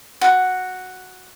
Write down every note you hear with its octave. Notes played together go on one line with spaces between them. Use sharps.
F#4